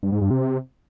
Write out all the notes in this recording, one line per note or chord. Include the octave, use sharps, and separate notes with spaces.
G2
G#2
G2
C3